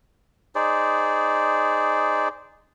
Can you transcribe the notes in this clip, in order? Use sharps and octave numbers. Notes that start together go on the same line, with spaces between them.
D#4 G#4 C5 D5